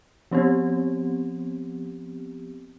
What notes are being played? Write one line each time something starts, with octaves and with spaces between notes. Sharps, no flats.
F3 B3 C4 G4